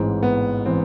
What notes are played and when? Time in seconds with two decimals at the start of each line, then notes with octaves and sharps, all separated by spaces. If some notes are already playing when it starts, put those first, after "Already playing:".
Already playing: A1 G#2 E3 C4
0.23 B3
0.66 E3 C4